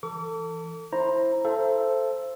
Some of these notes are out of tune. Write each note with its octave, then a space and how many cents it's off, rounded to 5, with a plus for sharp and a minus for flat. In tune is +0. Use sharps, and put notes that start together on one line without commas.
E3 +5 A4 +30 D6 -40
E4 +0 C5 +15 A#5 +0
A4 +0 C5 +0 E5 +45